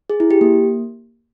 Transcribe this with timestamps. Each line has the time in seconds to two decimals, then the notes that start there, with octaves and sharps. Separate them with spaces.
0.10 G#4
0.20 E4
0.31 G4
0.41 A#3